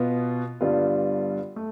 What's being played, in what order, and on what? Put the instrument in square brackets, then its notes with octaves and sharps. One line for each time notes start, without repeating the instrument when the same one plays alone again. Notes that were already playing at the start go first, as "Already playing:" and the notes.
Already playing: [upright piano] B2 B3 F4
G2 D3 G3 B3 F4
A3